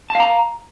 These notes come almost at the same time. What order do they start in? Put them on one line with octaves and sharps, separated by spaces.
A5 F5 A#5